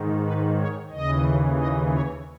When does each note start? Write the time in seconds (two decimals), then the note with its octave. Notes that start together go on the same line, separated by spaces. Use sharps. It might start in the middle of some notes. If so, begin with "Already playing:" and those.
Already playing: G#2 D#3
0.23 B4
0.58 C#5
0.91 D#2 C#3 E3 D#5
1.58 D#5
1.91 C#5